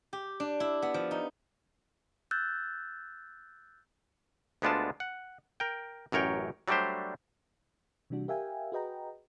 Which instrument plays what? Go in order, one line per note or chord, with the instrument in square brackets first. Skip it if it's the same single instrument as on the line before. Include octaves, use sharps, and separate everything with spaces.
[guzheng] G4
D4
E4
B3
F3
D#4
[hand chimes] E6 F#6 G6 A6
[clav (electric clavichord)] D2 G#3 B3 D4 F4 A5
F#5
A#4 G5
A1 F#2 A#4 C#5 G5
F#3 G3 A3 D4 G4 C5
[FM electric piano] C3 E3 G3 D4 F#4
G4 A#4 E5 F5 G5 G#5
F#4 G#4 B4 D#5 G5 A#5